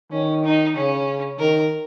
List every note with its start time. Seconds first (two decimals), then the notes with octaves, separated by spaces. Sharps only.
0.12 D#3 C#4
0.44 D#4
0.76 C#3 C#4
1.39 D#3 A#4